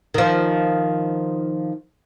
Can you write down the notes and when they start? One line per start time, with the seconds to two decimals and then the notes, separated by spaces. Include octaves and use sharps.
0.14 D#3 F3